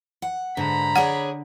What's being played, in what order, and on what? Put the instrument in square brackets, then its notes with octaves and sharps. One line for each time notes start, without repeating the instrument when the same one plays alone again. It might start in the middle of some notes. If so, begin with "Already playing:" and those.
[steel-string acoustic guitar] F#5
[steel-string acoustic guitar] G#2 [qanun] D3 C5 [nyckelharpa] A#5 B5
[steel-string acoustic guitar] D4 G#4 C#5 [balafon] F#5